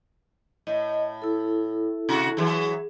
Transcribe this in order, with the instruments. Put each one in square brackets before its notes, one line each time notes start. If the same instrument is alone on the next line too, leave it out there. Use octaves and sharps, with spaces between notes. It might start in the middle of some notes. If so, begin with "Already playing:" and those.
[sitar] A2 [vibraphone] D#5
[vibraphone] E4 A4
[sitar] C3 F#4
[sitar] E3 F#3 [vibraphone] G#4